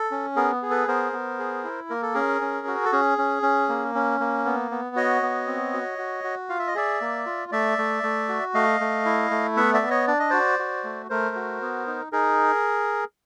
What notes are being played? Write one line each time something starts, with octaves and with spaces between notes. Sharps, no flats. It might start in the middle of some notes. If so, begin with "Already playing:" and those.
Already playing: A4
C#4
B3 G#4 A#4
G#4
A4 B4
B3 A#4 C5
B3
G#4
E4
A#3 A#4
A4
C#4 G#4 A#4
C#4
F#4
A4
C#4 G#4
C#4
C#4
A#3
C#4
A#3
B3
B3
F#4 C#5 D#5
B3
C4
F#4
F#4
F#4
F4 F5
E5
D#5
G#4 D5 E5
A#3
F4
A3 D5 E5
A3
A3
F#4
A3 D#5 F5
A3
E4
A3
B3 E5 F#5
D5 E5
B3
C#5 D#5
D4 D5
D#5
F#4 C5 D5
F#4
A3
A3 A#4 C5
F#4
B3
D#4
D#4 G#4 A#4